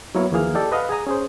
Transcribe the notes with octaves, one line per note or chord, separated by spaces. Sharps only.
F#3 A#3 B3 E4 A#4 C#5
D#2 E3 F3 A#3 G#4 F6
G4 A4 D5 D#5 G5
B4 D#5 F5 F#5
G#4 G#5 A#5 D#6
C#4 G#4 C5